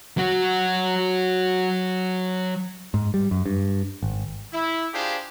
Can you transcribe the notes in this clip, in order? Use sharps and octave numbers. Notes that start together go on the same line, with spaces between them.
F#3 F#4
G#2
G3
F#2
G2
G#1
E4
D4 F4 G4 G#4 C5